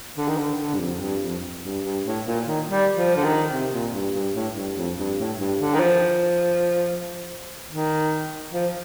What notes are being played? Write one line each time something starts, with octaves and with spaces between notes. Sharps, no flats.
D3
D#3
D3
D3
G2
F2
G2
F2
G2
G2
A2
A#2
D#3
G3
F3
D3
D#3
C3
A#2
G2
G2
A2
G2
F2
G2
A2
G2
D3
D#3
F3
D#3
F3